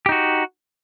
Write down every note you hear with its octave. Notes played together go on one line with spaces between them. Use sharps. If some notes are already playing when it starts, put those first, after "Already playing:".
D#4 F#4 G4